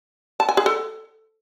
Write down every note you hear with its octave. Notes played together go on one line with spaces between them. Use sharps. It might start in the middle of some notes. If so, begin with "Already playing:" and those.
A5
G#5
G#4
A4